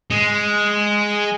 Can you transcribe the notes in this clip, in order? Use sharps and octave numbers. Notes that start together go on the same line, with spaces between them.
G#3